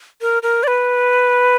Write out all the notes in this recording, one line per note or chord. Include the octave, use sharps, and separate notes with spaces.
A#4
A#4
D5
B4